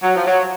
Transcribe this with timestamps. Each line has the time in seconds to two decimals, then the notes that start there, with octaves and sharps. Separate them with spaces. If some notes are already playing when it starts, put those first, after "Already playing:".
0.02 F#3
0.15 F3
0.26 F#3